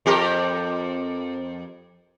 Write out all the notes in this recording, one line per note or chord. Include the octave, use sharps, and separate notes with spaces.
F2 G4 A#4